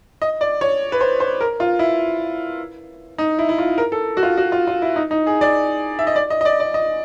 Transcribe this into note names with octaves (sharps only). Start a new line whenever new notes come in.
D#5
D5
C#5
B4
C5
C5
A#4
F4
E4
D#4
E4
E4
F4
A#4
A4
F#4
F4
F#4
F4
F4
E4
D#4
D#4
G#4
D5
E5
D#5
D5
D#5
D#5
D5
D5
D#5